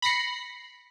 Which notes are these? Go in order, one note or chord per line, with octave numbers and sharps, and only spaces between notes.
B5 A#6 C7 C#7